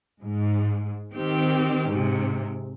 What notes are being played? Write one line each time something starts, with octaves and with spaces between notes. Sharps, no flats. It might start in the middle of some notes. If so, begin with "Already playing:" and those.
G#2
D#3 C4 G4
G#2 C3